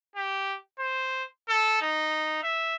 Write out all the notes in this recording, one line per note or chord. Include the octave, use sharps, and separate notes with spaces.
G4
C5
A4
D#4
E5